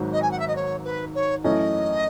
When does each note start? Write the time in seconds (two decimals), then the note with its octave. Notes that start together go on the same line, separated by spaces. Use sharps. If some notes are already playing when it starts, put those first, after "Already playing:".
Already playing: G#1 G#2 F#3
0.13 D#5
0.22 G#5
0.31 F#5
0.39 E5
0.48 D#5
0.56 C#5
0.85 B4
1.15 C#5
1.44 F#2 E3 A3 C#4 D#5